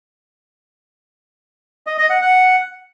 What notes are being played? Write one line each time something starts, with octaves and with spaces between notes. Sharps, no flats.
D#5
D#5
F#5
F#5